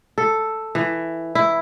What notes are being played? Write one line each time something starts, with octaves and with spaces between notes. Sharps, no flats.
A4
E3
E4